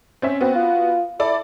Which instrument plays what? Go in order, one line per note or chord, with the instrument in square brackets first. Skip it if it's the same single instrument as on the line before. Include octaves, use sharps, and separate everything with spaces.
[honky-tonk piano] C4 C#4 E5
[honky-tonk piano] B3 F#4 [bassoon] C4
[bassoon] F4
[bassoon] E4 [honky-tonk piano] A4 D5